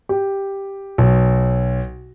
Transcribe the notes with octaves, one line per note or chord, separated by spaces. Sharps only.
G4
B1